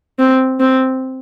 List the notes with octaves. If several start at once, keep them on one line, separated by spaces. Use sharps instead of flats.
C4
C4